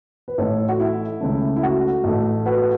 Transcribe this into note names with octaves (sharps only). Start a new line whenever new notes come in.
B4
A1 A2 A3 A4 C#5
F#4
E4
C#2 C#3 A3
E4
F#4
A1 A2 A3
F#4 B4